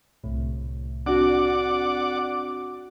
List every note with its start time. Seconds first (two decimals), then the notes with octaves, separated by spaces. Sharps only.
0.23 C2 A2
1.06 C4 D4 F#4 D5 F#5 D6